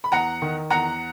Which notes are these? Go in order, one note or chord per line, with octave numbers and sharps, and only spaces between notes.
B5
E2 F#5 A#5
D#3
E2 F#5 A#5